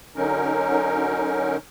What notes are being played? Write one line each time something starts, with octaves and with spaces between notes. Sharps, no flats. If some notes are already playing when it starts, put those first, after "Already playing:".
D3 F#3 C#4 D#4 A#4